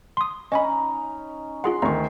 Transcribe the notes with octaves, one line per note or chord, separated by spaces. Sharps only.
C6 D#6
C#4 D#4 D#5 G#5 B5
F4 G#4 F#5 C6
D2 D#3 A#5 C#6